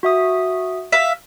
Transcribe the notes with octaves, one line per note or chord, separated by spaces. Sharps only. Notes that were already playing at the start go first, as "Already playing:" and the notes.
F#4 E5 D#6
E5 F5